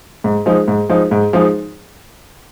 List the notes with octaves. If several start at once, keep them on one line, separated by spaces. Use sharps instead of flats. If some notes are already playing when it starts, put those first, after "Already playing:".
G#2
F3 G#3 D#4
G#2
F3 G#3 D#4
G#2
F3 G#3 D#4